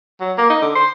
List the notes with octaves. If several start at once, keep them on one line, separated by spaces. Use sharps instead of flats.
F#3
A#3
D#4
D3
C5